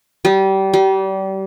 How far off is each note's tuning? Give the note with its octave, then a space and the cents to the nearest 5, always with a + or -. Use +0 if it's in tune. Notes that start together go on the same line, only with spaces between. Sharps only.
G3 -25
G3 -30